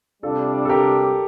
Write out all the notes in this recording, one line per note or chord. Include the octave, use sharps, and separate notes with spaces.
C3 G3 D4 F4 A4
A4
G4 A#4